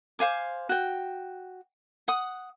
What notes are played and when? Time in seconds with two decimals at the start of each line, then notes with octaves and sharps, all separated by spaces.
0.19 C5 F5 G#5 D6
0.69 F#4 G5
2.08 F#5 D#6